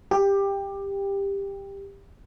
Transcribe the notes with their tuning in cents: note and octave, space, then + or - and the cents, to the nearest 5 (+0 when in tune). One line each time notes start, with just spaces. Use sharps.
G4 +15